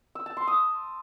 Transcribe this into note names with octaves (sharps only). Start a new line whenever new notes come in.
E6
A5
C6
D#6